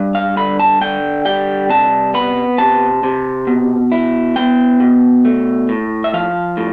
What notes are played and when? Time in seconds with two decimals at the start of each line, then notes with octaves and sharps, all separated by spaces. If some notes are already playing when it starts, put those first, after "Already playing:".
Already playing: G2
0.15 F5
0.37 D3 B5
0.60 A5
0.81 D3 G5
1.25 G3 G5
1.70 C3 A5
2.14 B3 B5
2.58 C3 A5
3.03 C3
3.47 B2
3.92 E4
4.36 B3 G5
4.80 B2
5.25 A3
5.69 A2
6.04 E5
6.14 F3 F5
6.57 A2